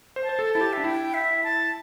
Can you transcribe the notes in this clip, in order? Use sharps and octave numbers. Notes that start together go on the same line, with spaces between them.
C5
A5
C5
A4
E4 A5
G4
D4 E5
E4 G5
E5
A5